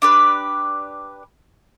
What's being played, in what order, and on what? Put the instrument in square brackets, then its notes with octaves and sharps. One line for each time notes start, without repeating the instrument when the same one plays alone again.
[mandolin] D4 G4 B4